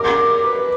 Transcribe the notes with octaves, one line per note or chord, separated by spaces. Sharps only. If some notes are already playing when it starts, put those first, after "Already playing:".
Already playing: A#4 D6
B4